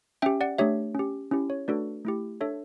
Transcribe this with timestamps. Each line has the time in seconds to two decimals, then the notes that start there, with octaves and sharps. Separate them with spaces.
0.22 C#4 G4 E5 G5
0.41 D5 F#5
0.58 A3 D4 G4 C#5 E5
0.95 C#4 G4
1.31 C#4 E4 G4
1.50 C#5
1.68 A3 D4 F#4 A4 B4 D5
2.05 A3 E4 G4
2.41 D4 A4 C#5 E5